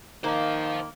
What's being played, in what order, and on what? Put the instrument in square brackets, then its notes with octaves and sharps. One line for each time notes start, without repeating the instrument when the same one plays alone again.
[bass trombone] D#3 [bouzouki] A#3 [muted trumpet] D#4 [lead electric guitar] C5 F5